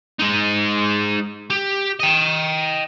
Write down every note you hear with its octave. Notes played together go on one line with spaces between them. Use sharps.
G#3 D#4
G4
D#5 G5